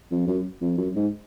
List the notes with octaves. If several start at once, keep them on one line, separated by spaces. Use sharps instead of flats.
F2
F#2
F2
F#2
G#2